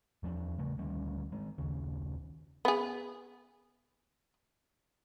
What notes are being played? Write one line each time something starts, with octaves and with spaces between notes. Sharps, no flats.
E2 F3 F#3 D4
A#2 C#3 A3
D2 D#3 G3 C#4
D#3 G#3
D#1 D#2 C#3
B3 G#4